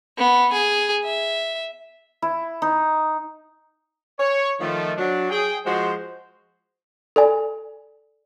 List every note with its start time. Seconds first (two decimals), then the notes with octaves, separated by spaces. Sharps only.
0.18 B3
0.53 G#4
1.04 E5
2.22 E4
2.62 D#4
4.20 C#5
4.60 D#3 F3 A3
4.97 F#3 D4
5.30 G#4 G5
5.65 F3 G#3 F#4 C5
7.16 A4 D5 G#5